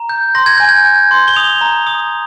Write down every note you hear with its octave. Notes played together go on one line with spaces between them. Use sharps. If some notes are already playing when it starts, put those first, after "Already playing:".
Already playing: A#5
G6
C6 A#6
G#6
G#5 G6
G#6
G6
C6
G7
D#6 F7
A#5
D#6